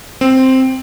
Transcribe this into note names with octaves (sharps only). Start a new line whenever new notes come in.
C4